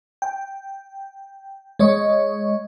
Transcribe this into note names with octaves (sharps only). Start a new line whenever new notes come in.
G5
G#3 C#5 D#5 C#6